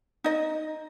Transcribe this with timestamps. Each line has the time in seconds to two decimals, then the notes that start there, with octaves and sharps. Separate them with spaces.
0.24 D#4 D#5